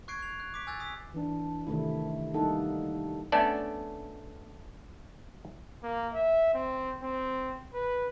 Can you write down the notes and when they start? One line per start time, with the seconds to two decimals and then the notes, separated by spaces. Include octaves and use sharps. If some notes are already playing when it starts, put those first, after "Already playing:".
0.08 C#6 F#6 G#6 C7 D7
0.22 F7
0.40 F#6
0.54 D6 B6 D7
0.67 G#5 E6 F#6 G6 A6
0.80 D#6 B6
1.14 E3 D4
1.67 C3 D#3 A3 E4
2.34 G3 A#3 D#4 A4 F#5
3.32 A3 B3 C#4 D4 A4 D5
5.83 A#3
6.14 E5
6.54 C4
7.03 C4
7.74 B4